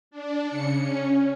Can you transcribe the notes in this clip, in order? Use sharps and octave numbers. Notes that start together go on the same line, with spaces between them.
D4
C#3 C#7
C#4